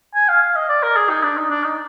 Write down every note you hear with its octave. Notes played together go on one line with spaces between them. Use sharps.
G#5
F5
F5
D#5
D5
A#4
G#4
D#4
D4
D#4
D4
D#4